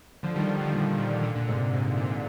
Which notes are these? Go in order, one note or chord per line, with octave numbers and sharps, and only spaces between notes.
D3 F3
D#3 G3
D3 F3
A#2
A#2 D3
A#2 D3
A#2 D3
G#2 C3
G#2
A#2